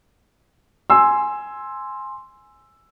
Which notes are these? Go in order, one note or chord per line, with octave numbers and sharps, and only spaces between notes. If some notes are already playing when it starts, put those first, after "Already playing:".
G#5 C6 E6